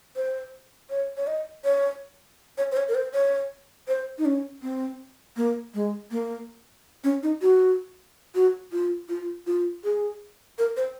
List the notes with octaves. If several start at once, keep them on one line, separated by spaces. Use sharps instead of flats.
C5
C#5
C#5
D#5
C#5
C#5
C5
C#5
A#4
C5
C#5
C5
D#4
C#4
C4
A#3
G#3
A#3
C#4
D#4
F#4
F#4
F4
F4
F4
G#4
A#4
C5